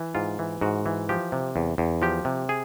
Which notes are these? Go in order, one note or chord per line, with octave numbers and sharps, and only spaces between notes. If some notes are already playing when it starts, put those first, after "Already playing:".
Already playing: E3
G#2 F4
E3
G#2 F#4
E3
F3 G4
C3
E2
E2
F3 G4
C3
G#4